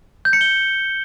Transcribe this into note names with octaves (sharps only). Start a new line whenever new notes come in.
G6
C#7
G7